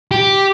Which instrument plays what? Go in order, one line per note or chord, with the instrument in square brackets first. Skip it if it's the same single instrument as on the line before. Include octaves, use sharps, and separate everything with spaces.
[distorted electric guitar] G4